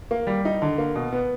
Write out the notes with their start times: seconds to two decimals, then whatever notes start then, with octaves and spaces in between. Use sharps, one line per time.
0.11 A#3
0.27 G3
0.45 D#4
0.62 D3
0.78 A#3
0.95 B2
1.13 B3